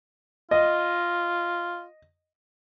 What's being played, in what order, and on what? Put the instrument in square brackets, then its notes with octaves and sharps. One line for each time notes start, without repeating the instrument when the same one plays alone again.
[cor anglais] F4 [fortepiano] D#5